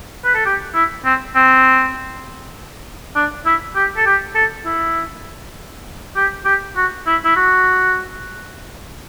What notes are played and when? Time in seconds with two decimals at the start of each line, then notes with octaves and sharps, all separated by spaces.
0.25 B4
0.35 A4
0.46 G4
0.75 E4
1.05 C4
1.35 C4
3.16 D4
3.45 E4
3.76 G4
3.97 A4
4.06 G4
4.35 A4
4.66 E4
6.16 G4
6.45 G4
6.76 F#4
7.07 E4
7.25 E4
7.36 F#4